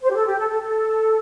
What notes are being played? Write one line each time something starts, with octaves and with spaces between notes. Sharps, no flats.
C5
G4
A4
G4
A4
A4
A4